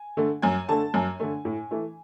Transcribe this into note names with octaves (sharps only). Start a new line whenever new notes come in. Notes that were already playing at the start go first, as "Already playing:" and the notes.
Already playing: G#5
D3 A3
F#2 G#5
D3 A3 A5
F#2 G#5
D3 A3
A2
E3 A3